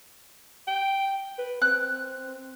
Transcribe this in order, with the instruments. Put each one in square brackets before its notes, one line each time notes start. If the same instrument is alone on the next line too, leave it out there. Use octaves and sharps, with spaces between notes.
[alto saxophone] G5
B4
[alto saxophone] C4 [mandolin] F#6